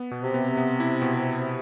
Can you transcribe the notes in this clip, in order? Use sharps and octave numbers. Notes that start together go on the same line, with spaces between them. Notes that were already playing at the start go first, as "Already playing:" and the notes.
Already playing: B3
B2
C3
B3
B3
E4
B2